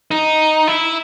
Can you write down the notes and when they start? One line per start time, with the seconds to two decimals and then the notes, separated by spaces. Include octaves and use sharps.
0.11 D#4
0.67 E4